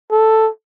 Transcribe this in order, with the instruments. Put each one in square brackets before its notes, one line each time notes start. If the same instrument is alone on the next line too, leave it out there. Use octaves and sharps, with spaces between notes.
[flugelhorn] A4